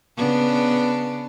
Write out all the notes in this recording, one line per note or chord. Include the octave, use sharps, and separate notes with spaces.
C#3 B3 D4